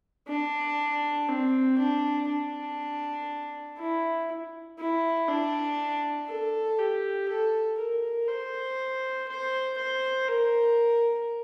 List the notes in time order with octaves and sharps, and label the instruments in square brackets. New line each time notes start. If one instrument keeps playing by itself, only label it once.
[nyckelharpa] D4
C4
D4
D4
E4
E4
D4
A4
G4
A4
A#4
C5
C5
C5
A#4